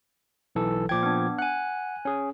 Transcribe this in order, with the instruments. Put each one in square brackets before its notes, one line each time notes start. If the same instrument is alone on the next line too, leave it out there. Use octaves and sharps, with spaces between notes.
[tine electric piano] B1 E3 A4
[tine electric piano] A#2 F3 G#6 [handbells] G5 D6
[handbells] B3 D4
[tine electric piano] F#5 [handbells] G#5 F#6
[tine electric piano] C#4 G#4